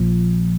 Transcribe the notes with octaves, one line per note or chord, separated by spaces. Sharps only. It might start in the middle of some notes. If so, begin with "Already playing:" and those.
Already playing: A#1 A#2 F3